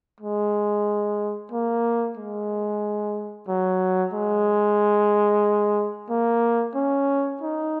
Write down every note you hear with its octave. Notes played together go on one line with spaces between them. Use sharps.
G#3
A#3
G#3
F#3
G#3
A#3
C#4
D#4